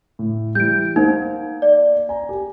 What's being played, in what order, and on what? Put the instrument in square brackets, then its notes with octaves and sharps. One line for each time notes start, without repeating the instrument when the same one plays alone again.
[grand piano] A2
[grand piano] E3 G3 [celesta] G6 D7
[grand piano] A#3 C5 F#5 [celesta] D#4
[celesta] D5
[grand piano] G#5 A#5
G4